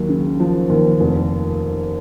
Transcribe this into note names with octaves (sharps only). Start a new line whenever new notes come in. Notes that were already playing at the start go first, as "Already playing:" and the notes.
Already playing: D#2 F#3
C#3
F3
D#2
F1